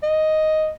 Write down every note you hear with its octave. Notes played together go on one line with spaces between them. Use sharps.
D#5